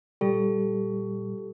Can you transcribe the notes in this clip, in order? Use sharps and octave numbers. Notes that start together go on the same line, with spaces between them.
A#2 G3 G4 A4